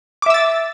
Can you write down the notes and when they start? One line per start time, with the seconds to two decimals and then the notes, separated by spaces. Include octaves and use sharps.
0.22 D6
0.26 E5
0.30 E6
0.34 A6